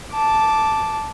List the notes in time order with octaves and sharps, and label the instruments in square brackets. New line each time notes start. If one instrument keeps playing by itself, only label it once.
[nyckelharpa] A5 D6